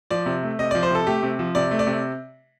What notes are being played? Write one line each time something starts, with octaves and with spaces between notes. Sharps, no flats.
F3 D5
C3
A3
C3 D#5
F3 D5
C5
C3 A4
A3 G4
C3
F3
C3 D5
A3
D5
C3